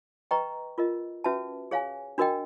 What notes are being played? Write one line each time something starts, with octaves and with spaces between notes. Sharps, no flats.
B4 D#5 G5 A#5 C#6
F4 A#4 D#5
C#4 F#4 B4 E5 A5
G#4 C#5 F5 G#5
D4 F#4 A#4 D#5 G5